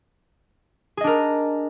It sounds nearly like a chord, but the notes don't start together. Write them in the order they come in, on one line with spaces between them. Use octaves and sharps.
G#4 D#5 D4 A#4